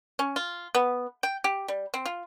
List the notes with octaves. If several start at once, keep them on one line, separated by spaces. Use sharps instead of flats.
C#4
F4
B3
G5
G4
G3
C4
F4